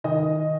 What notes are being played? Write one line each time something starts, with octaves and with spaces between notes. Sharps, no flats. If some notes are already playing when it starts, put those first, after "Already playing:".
D#3 D#5